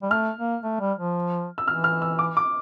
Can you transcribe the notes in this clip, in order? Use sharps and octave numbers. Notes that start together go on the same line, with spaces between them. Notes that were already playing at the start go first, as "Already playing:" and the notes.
G3
A3 F6
A#3
A3
G3
F3
E6
E3 F6
F6
E6
D6
D6